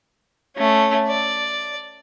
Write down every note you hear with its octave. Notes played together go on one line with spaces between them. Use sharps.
A3 C#4
D5